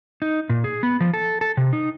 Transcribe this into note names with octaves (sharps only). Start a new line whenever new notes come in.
D#4
A#2
G#4
B3
F3
A4
A4
C3
D#4